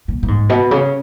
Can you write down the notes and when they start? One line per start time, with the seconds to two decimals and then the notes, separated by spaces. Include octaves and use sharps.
0.08 A#2
0.23 A#2
0.28 G#2
0.49 B2
0.71 C#3